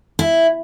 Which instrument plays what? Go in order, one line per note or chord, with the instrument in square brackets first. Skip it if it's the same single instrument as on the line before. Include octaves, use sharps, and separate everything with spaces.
[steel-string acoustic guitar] E4